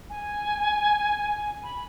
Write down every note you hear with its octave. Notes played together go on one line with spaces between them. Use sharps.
G#5
B5